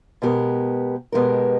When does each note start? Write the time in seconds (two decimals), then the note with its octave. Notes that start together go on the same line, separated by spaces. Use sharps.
0.22 B2 G#3 B3 G4 A#4
1.12 B2 G#3 B3 G4 A#4